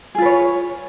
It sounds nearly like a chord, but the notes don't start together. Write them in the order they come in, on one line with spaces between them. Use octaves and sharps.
G#4 F4 B4 C#5